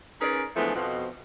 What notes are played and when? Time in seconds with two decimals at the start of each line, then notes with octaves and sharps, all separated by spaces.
0.21 C#4 D#4 G#4 A#4 B4 D5
0.56 E3 F3 G#3 A3 B3 D4
0.75 F2 B2 F3